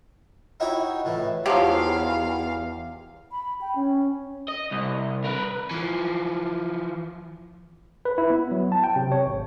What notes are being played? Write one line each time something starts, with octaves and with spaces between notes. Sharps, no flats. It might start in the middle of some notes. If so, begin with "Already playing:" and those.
D#4 E4 F#4 C#5 G5
A2 E3
E2 D#3 F3 F#3 G4 F5
B5
G5
C#4
D#5
C2
A#4 B4
E3 F3
B4
E4
B3
F#3
A5
G5
C3
C#5
G#1